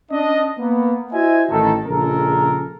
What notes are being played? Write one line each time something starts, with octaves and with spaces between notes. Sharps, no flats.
C#4 D4 D#5
A#3 B3
E4 F#4 C5 D#5 E5 G#5
A1 D#3 A4
A#1 C#3 G#3 A4 A#4